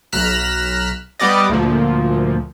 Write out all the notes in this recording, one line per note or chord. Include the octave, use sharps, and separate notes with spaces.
B1 A#5 F6 F#6 B6 E7
G3 B3 G4 D5 D#5
D2 A#2 F3